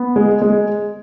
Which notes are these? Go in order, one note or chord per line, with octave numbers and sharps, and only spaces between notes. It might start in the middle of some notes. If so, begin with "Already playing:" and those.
Already playing: B3
G#3
G#3